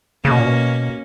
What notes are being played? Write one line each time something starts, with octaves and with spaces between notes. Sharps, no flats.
C#3 A#3 C#4
B2
A#2
B2